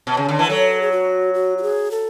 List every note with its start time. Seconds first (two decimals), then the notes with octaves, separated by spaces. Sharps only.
0.07 B2
0.17 C#3
0.29 D3
0.39 E3
0.45 B4
0.49 F#3 A4
0.82 G#4
0.92 F#4
1.34 F#4
1.58 F#4
1.63 G#4
1.91 A4